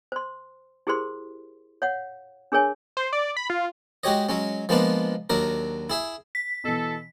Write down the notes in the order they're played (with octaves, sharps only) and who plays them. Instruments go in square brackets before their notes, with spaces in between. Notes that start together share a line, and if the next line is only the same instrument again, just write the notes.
[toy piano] C5 C6
E4 G4 G#4 A#4 C5 C6
C#5 F5 F#5
D4 G#4 A#4 C#5 G#5
[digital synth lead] C5
D5
B5
F4
[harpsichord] G#3 F#4 G4 C#5 D#5
F#3 G#3 C#4
F3 G#3 A#3 B3 D4 F4
D#2 F#3 D4 A#4
E4 G#4 E5
[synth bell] B6
[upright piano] B2 E3 [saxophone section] A4